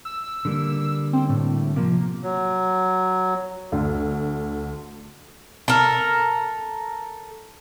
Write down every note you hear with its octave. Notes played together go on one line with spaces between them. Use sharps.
E6
D3 G3 A#3
C4
A2
C3 F3 A#3
F#3
D2
A4 A#4